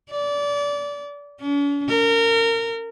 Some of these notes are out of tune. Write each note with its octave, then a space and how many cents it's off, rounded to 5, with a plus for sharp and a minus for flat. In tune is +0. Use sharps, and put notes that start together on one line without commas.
D5 -25
C#4 +45
A#4 -25